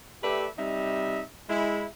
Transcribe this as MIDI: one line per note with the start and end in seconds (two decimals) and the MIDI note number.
0.23 0.47 57
0.23 0.47 67
0.23 0.47 71
0.23 0.47 74
0.23 0.47 76
0.59 1.22 48
0.59 1.22 55
0.59 1.22 63
0.59 1.22 76
1.50 1.87 56
1.50 1.87 64